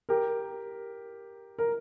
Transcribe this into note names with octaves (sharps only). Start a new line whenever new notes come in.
G4 A#4
A#4